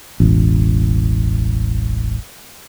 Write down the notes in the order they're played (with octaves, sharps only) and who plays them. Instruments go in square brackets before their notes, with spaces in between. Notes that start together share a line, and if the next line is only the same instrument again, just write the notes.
[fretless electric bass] E1 A1